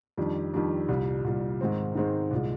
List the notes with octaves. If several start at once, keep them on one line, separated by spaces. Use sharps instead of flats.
F2 D#3 G3 D4
F2 D#3 G3 D4
C2 A#2 G3
C2 A#2 G3
G#2 D#3 G#3 C4
G#2 D#3 G#3 C4
C2 A#2 G#3